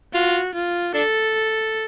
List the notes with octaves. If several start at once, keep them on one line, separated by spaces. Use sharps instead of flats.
F4 F#4
F4
D4 A4